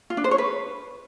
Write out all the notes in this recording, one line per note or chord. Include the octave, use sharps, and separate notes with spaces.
F4
D4
C5
C#5
B4